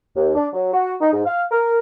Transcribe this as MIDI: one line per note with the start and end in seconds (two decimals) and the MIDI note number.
0.15 0.32 39
0.34 0.47 62
0.53 0.71 54
0.73 0.93 66
0.99 1.09 63
1.13 1.21 44
1.25 1.43 77
1.50 1.78 70